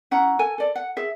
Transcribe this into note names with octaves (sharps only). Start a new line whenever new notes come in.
C#4 E4 F#5 A#5
A4 G#5
A4 D5
F#5
G#4 E5